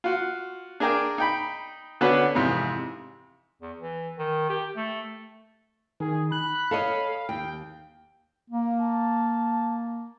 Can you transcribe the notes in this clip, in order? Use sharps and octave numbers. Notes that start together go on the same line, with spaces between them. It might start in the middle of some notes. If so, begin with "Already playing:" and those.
F4 F#4
D4 G#4 A#4 D5 G5
D#4 G5 B5
D3 B3 C#4 D4 F#4 B4
F2 G#2 C3 E3
E2
E3
D#3
G4
A3
D#3 G#4
B5 F#6
A4 C#5 D#5 F5
D#2 G5
A#3
A5